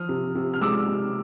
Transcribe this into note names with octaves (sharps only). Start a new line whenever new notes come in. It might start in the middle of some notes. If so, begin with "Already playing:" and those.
Already playing: F3 D#6 F6
C3
C3
F6
G#3 D6 E6
C3